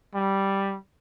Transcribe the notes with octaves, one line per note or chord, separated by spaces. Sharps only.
G3